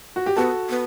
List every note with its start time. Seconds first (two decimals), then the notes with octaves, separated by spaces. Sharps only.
0.16 F#4
0.26 G4
0.36 B3 F#4 A4
0.70 B3